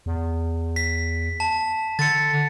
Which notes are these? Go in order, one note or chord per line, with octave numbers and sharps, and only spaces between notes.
E2
B6
A5
D3 A6 C#7